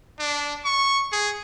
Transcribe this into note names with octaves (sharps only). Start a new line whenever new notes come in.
D4
C#6
G#4